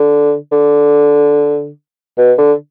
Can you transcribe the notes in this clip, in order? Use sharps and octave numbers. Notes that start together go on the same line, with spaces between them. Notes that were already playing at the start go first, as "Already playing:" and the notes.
Already playing: D3
D3
B2
D3